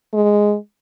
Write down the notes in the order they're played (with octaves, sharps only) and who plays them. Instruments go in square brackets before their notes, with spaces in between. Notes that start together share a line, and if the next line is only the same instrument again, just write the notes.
[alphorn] G#3